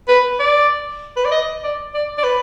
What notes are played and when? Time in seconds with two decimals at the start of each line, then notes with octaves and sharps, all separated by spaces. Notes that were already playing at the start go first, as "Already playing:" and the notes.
0.08 B4
0.39 D5
1.16 B4
1.25 D5
1.31 D#5
1.63 D5
1.94 D5
2.18 D5
2.24 B4